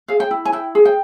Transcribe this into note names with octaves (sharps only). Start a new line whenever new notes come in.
G#4 F5
G5
E4
G#5
E4 G5
G#4
G5